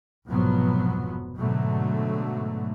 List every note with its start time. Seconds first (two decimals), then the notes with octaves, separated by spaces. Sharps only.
0.28 F1 G#2 B2 F3 F#3 B3
1.37 G#2 B2 D3 F#3 A3